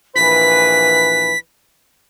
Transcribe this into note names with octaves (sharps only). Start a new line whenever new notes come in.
A#1 E3 B4 B6